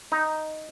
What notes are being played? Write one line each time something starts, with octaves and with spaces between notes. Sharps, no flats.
D#4